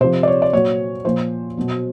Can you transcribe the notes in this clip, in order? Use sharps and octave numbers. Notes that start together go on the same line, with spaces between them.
C3 F3 C5
D5
C#5
D5
A#2 F#3 C#5
A#2 F3 C5
B2 F#3